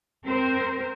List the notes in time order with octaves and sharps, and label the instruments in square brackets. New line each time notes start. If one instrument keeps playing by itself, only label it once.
[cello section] C4 A#4 C5